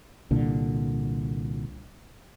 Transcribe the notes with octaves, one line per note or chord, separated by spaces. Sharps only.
C2 A#2 D3